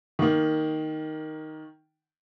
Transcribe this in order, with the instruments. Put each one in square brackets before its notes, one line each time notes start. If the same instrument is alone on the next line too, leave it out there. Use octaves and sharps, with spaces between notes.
[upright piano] D#3 A#3